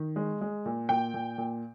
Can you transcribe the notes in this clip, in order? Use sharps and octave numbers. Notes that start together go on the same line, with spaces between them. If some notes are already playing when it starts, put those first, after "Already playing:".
Already playing: D#3
G#3
G#3
A#2
A#2 G5
A#2
A#2